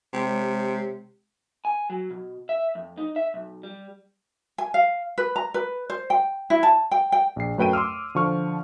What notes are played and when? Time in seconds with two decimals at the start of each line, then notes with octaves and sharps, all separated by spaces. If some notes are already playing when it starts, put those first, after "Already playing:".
0.13 C3 G#3 G4 C#5
1.65 G#5
1.90 F#3
2.11 B2
2.49 E5
2.75 F2
2.98 D#4
3.16 E5
3.34 B1
3.63 G3
4.58 G#5
4.74 F5
5.18 B4
5.36 A#5
5.54 B4
5.90 C5
6.10 G5
6.50 E4
6.63 A5
6.91 G5
7.12 G5
7.36 A#1 C7
7.58 F#2 A3 B4 G5 D7 D#7
7.73 C6 D6 E6 F6
8.15 D3 F3 C#6 F6